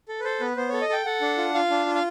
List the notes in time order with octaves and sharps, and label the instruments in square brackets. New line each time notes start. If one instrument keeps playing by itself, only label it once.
[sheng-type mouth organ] A4
B4
A4 C5
B3 B4
B3 C5
A4 C#5
D#5
A4 G5
A4 F#5
D4
F4
F4 F5
D4
F4
F5